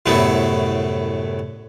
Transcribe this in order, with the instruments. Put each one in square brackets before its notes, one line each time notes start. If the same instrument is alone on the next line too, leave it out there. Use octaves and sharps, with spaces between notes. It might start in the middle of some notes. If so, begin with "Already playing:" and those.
[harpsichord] C2 F#2 A2 F#3 A3 B3